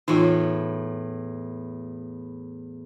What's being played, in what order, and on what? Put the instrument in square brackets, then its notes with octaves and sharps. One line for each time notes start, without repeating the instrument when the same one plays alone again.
[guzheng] E2 A2 [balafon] D#4 F4